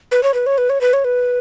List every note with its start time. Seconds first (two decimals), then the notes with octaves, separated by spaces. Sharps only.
0.12 B4
0.23 C#5
0.34 B4
0.46 C#5
0.58 B4
0.70 C#5
0.81 B4
0.93 C#5
1.05 B4